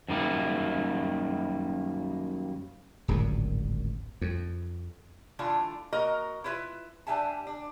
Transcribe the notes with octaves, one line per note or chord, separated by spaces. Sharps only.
F#2 D#3 G3 A#3
D1 G#1 F#2 A#2
F2
D3 E3 A3 D4 F4
A#3 F#4 A#4 D#5 A#5
E4 F4 B4 D5 E5
G3 D4 E5 G#5 A5
D4